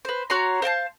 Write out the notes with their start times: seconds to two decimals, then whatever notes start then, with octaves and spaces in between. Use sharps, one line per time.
0.05 B4 C5
0.30 F#4 C#5 A#5 C6
0.62 C5 F5 G5 A5